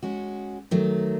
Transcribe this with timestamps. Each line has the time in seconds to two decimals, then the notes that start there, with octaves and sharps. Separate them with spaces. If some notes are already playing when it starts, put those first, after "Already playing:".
0.03 G#3 C#4 F#4
0.71 D#3 F#3 A3